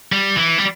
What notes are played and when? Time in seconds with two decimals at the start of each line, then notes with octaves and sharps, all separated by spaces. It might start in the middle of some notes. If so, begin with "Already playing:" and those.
0.12 G3
0.37 E3
0.58 G3